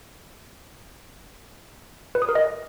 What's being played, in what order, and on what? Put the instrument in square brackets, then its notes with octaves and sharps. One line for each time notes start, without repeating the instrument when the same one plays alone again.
[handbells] B4
D#6
A#4
D#5